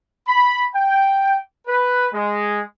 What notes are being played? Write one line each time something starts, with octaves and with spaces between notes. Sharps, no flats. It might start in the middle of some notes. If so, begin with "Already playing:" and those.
B5
G5
B4
G#3